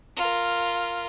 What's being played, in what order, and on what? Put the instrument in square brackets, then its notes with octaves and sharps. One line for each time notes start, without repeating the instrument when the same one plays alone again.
[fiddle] F4 A#4